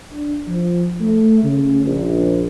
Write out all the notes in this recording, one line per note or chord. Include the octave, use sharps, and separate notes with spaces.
D4
F3
A3
C#3
A#1